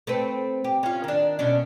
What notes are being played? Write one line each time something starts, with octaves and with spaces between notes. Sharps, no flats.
A3 C4 B4
G4
C#4 F4
D#3 D4
B2 C#4 D4